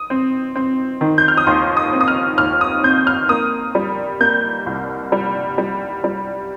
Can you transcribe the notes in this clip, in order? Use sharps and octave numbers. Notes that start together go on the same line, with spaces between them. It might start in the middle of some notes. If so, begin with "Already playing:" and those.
Already playing: D#6
C4
C4
D#3
G6
F6
D#6
D#2 C6
D#6
C4
D#6
F6
D#2 F6
D#6
C4 G6
F6
A#3 D#6
G3
A#3 G6
C2
G3
G3
G3